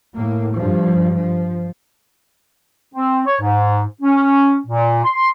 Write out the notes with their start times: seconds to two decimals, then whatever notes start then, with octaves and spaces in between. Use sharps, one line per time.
0.15 A2 A#3
0.56 G2 F3
1.18 F3
2.95 C4
3.26 C#5
3.41 G#2
4.02 C#4
4.67 A#2
5.04 C6